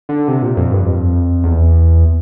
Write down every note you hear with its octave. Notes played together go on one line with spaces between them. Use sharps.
D3
C3
A#2
F2
G2
F2
E2